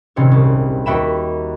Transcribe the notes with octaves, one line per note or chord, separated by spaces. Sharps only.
D#1 G#1 C3 C4 C#4 C#5
C2
D#2 F#4 E5 G5 B5 E7